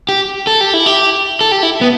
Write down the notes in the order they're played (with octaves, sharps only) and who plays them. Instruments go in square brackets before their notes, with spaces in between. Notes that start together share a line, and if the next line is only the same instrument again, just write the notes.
[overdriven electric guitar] G4
A4
G4
E4
G4
A4
G4
E4
B3